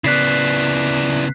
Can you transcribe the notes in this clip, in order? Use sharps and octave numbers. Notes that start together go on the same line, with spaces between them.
C#3 B3 E4 D5 F#6 B6 C7